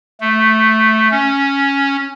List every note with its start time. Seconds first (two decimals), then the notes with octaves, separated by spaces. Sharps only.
0.20 A3
1.11 C#4